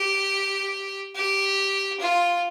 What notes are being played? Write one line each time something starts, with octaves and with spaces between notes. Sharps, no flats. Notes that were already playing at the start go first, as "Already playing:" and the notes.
Already playing: G4
G4
F4